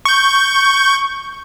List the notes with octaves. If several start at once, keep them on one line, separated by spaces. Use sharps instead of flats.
C#6 G6